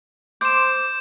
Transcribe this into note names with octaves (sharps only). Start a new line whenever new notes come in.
C5 D6 G6 E7